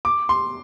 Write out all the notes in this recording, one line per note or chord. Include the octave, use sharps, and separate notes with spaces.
D6
C6